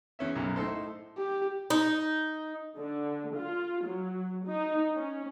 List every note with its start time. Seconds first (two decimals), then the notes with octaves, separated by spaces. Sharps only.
0.19 E2 C#4 E5
0.35 B1 F#2
0.56 A2 D#4 A4 C5
1.17 G4
1.70 D#4
2.77 D3
3.35 F4
3.85 F#3
4.45 D#4
4.94 C#4